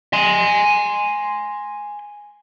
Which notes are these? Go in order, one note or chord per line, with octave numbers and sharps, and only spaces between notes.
G#5 C6